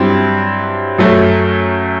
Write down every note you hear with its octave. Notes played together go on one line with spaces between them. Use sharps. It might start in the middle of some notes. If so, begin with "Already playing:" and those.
Already playing: G2 F#3 C4 E4
F#2 F#3 A3